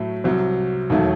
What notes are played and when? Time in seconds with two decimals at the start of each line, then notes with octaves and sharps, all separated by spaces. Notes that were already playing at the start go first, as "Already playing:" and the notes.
Already playing: A2 F#3 A3
0.24 C2 C3 F#3
0.90 E1 D#2 D#3 F#3 A3